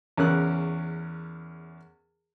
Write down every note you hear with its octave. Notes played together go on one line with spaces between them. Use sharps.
E2 C#3 C#4 A#4 F#6